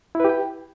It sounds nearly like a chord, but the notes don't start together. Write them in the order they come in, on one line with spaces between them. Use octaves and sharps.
E4 B4 G4 G5